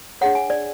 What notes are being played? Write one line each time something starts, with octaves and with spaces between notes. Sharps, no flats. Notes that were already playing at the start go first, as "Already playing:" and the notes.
D4 G#4 C#5 F#5
G#5
D5